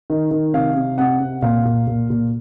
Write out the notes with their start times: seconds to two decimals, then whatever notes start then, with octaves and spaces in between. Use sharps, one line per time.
0.10 D#3
0.31 D#3
0.54 C3 F5
0.76 C3
0.98 C3 F#5
1.20 C3
1.42 A#2 F5
1.65 A#2
1.87 A#2
2.10 A#2